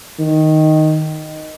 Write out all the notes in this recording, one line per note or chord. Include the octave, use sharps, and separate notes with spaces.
D#3